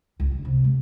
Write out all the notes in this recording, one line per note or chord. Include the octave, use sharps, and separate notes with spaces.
C#2
D3
C3
G#3